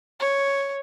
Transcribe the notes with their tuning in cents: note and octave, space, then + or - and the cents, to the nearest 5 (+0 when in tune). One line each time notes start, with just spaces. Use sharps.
C#5 +0